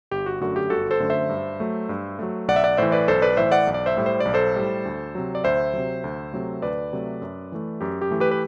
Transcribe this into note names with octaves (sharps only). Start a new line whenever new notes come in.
G1 G4
F#4
F#2 D3 A3 F#4
G4
G1 F#4 A4
A4 C5
F#2 D3 A3
C5 E5
G2
F#3 A3
G2
F#3 A3
B1 D5 F#5
E5
D5 F#5
A2 E3 C5 E5
B4 D5
B1 A4 C5
B4 D5
A2 E3 C5 E5
D5 F#5
B1
D5
C5 E5
A2 G3
C5
B1 D5
A4 C5
A2 G3
D2
C3 F#3
D5
D2 C5 E5
C3 F#3
D2
C3 F#3 A3
D2 B4 D5
C3 F#3 A3
F#2
E3 A3
F#2 G4
G4
E3 A3
G4 B4
B4